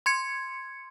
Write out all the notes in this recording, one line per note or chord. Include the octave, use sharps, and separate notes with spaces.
C6 G#6 C#7